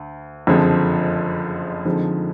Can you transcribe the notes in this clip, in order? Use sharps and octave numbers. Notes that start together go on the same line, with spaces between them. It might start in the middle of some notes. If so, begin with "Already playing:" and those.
Already playing: D2
F#1 F2 D3 F3 G#3
F2 D3 F3 G#3 D#4